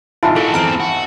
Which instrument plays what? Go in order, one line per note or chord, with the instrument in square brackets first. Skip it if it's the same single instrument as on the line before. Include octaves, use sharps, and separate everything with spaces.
[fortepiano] G#1 F4 [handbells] E4 [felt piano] E5 A5 B5
[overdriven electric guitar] D#3 F#4 [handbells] E4 A4
[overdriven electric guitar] E2 C4 [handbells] A#5 F6 D7
[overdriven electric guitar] F#4